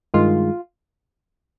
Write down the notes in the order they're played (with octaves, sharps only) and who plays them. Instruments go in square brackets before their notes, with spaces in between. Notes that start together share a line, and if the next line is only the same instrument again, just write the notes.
[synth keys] G2 D#3 G#3 F4